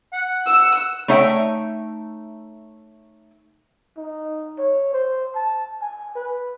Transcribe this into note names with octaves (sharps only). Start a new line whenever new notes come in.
F#5
E6
A3 D#4 C#5 E5 F#5 G5
D#4
C#5
C5
A5
G#5
B4